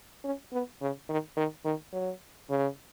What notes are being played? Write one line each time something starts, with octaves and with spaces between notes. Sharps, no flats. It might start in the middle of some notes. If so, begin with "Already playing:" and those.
C#4
B3
C#3
D#3
D#3
D#3
F#3
C#3